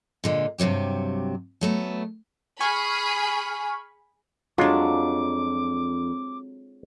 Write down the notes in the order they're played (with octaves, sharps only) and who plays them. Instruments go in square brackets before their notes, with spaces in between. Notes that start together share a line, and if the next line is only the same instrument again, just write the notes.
[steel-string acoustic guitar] A#2 D3 G#3
G2 C3 E3 F#3 G4
F#3 A3 B3
[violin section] G#4 B5 [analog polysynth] G#5 C#6 F6
[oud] F2 [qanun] F#3 D4 [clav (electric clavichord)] G#3 F4 [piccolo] D6